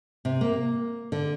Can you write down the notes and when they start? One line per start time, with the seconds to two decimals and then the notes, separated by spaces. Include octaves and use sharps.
0.25 C3
0.41 A#3
1.12 D3